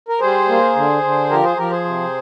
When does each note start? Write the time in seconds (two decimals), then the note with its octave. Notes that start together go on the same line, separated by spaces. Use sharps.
0.09 A#4
0.20 G3 G#4 C5
0.48 A#3
0.75 D3
1.02 D3
1.30 F3 G4 A#4
1.44 G#4 C5
1.57 F3 G4 A#4
1.71 G#4 C5
1.84 C3